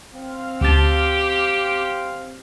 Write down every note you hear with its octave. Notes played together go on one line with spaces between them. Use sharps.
C4 F5
D2 G4 A5